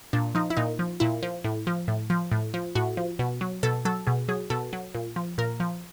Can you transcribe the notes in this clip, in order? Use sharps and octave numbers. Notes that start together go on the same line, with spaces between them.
A#2 D4
F3 D#4
E4
A#2 D#4
F3
A#2 E4
F3
A2
F3
A2
F3
A2
F3
A2 F#4
F3
B2
F#3
B2 A4
F#3 A4
B2 G#4
F#3 G#4
B2 A4
F#3
A#2
F3
A#2 A#4
F3